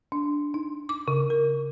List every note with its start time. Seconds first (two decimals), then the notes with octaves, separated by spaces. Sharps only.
0.12 D4
0.54 D#4
0.89 D6
1.08 C#3
1.30 A#4